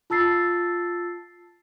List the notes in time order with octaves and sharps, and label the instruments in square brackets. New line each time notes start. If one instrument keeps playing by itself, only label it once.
[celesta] F4 A5 E6 A6 C7